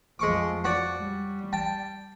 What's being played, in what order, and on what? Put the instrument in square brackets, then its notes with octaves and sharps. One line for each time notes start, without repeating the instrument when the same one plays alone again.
[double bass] F2 F3 [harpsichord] G#3 C#6 D6
[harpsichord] F#4 C#5 D5
[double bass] G3
[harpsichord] G5 A5